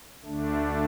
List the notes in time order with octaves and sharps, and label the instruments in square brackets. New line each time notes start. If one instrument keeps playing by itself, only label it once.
[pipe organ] D2 D3 A3 D4